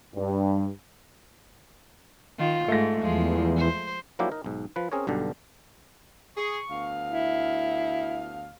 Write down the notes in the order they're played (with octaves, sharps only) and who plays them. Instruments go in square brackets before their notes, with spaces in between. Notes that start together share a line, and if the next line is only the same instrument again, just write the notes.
[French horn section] G2
[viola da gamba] D#3 F4
[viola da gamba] G#2 [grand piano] A3 A#6
[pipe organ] E2 [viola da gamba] F3 G#3
[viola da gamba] C5
[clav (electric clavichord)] F3 F#3 A#3 D4 E4 G4
D#4 A#4
B1 G#2
F3 B4
C4 C#4 G#4 A#4 C#5
B1 G2 B2 D3 G4
[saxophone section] G#4 [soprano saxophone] C#6
[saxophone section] D2 B3 F5
[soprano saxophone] E4